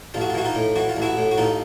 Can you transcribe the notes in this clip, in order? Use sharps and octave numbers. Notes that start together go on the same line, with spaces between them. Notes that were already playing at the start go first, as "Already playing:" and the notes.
A1 F4
F#4
F4
E3 F#4
D#4 F4
A2
E3 F#4
F4
A1
E4 F#4
A2
F#4
A1 D#4 F4